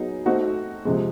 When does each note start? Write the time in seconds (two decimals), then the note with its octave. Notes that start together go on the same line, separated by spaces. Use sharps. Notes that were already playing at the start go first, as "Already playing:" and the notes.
Already playing: F#3 B3 D#4 G#4
0.26 A3 C4 D#4 F#4
0.85 C3 F3 G#3